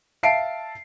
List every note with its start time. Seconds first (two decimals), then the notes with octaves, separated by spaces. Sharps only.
0.23 E5 F5 A5 C7 D7